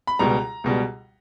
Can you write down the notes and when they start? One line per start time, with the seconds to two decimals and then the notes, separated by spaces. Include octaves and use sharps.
0.07 B5
0.19 C#2 B2 G3 A#5
0.64 C#2 B2 G3